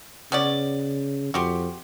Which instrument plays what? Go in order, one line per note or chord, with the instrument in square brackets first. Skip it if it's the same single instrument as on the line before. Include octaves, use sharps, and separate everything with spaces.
[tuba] C#3 [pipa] B3 C#4 D5
[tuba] F2 [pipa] F#4 G4 C6